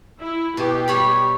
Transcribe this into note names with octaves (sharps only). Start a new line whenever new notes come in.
E4
B2 G4
G3 C#5 B5